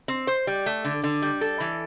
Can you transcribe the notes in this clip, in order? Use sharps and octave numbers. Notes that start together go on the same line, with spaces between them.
C4
C5
G3
A3
D3
D3
G3
A4
E3